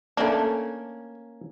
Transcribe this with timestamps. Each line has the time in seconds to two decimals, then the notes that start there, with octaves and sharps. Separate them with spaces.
0.17 A3 A#3 C#4 D4